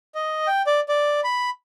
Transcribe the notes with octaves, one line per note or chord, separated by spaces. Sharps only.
D#5
G5
D5
D5
B5